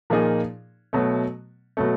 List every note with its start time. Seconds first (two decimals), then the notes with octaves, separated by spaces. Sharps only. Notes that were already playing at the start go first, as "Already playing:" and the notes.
0.10 A#2 F3 A#3 D#4 G#4
0.93 B2 F#3 A3
1.77 B2 F#3 A3